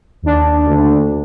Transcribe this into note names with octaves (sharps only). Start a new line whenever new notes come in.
D#2 D4
D2